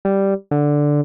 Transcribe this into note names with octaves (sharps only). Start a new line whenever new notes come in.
G3
D3